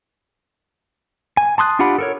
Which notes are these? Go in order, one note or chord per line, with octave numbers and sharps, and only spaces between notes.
G#5
A5 C6 D#6 F#6
D4 F4 G4 F#5 B5
A4 A#4 C#5